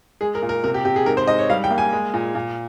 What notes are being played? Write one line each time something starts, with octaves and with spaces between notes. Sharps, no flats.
G#3 G#4
A#4
A#2
A#4
C3 A#4
G4
C3 G4
G#4
G#2 A#4
C5
G#2 D#5
C#5
G3 F5
G5
A#3
G#5
G#3
A#2
A#2